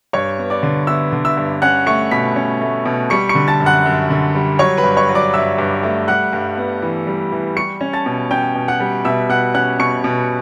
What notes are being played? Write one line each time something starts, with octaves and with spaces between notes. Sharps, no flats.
G2 C#5 C#6
B3
D5 D6
D3
B3 E5 E6
D3
E5 E6
G2
C#4 F#5 F#6
A3 C#6 C#7
B2 B5 B6
C#4
A3
B2
G3 C#6 C#7
C#6 C#7
D3
A5 A6
F#2
F#5 F#6
F#2
D3
G3
F#3 C#5 C#6
B4 B5
G2
C#5 C#6
F#3
D5 D6
G2 E5 E6
G2
A3
G3 F#5 F#6
G2
B3
E3
G3
E3
G3 C#6 C#7
C#4
A5 A6
B2
C#4 G5 G6
B2
F#5 F#6
G3
B2 E5 E6
B2 F#5 F#6
C#4 F#5 F#6
B2 C#6 C#7
B2